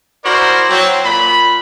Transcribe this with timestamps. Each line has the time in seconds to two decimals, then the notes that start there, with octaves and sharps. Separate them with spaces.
0.24 E4 F#4 A#4 C5 D5
0.69 F#3 C4
1.04 A#2 B5